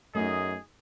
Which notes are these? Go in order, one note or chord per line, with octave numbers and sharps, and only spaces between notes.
F#2 A3 D#4 G#4 D#5